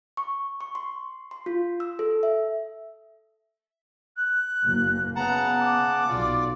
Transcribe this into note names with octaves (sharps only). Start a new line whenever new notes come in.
C#6
C#6
C6
C6
F4
E6
A4
E5
F#6
F#1 A#3
C#3 B3 F#5 A5 A#5
D6
B1 F4 D5